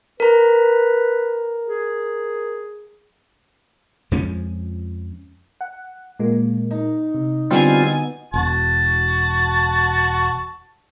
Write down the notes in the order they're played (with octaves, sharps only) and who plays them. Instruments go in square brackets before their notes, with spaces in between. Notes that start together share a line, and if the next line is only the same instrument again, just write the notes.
[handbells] A#4 A#5 [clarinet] B4
[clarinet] G#4
[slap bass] F2 F3 G#3 C#4
[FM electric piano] F#5
A#2 G#3 A#3
[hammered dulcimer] D#4
[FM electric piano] C3
[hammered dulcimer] B2 B3 [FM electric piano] D3 [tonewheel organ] G3 C4 F4 [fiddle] G#5
[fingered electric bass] E1 [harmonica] F#4 A5